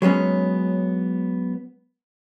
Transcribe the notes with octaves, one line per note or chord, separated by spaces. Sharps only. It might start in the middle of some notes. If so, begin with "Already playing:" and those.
F#3 G#3 B3 C#4